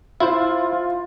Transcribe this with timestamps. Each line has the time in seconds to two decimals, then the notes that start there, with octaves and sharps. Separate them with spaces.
0.20 E4 F4 C5